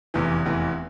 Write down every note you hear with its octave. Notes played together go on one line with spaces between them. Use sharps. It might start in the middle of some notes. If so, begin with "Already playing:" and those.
F1 E2 E3
F1 E2 E3